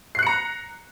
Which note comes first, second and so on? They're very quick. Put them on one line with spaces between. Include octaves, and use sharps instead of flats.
C7 F#6 C#7 A#5